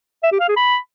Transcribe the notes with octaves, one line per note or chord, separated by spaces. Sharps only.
E5
G4
F5
G#4
B5